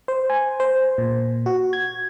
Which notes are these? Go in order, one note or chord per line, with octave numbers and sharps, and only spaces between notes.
C5
G#5
C5
A#2
F#4
G#6